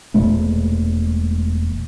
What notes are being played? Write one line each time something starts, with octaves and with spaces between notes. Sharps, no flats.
E1 A#2 G#3 A3